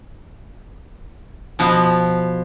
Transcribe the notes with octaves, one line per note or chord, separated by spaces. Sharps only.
B2 F3 B3